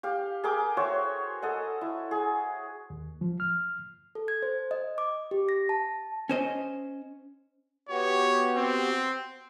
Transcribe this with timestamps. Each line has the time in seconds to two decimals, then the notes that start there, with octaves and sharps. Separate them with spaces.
0.03 G4 F5
0.44 G#4 A#4 G5 D6
0.77 F#4 C5 C#5 E5
1.42 A4 D#5 F#5
1.81 E4
2.11 G#4
2.90 D#2
3.21 F3
3.40 F6
4.15 A4
4.28 G#6
4.42 C5
4.71 D#5
4.98 D6
5.31 G4
5.49 A#6
5.69 A5
6.29 C#4 C5 D#5
7.89 B3 F#4 G4 C#5
8.56 C4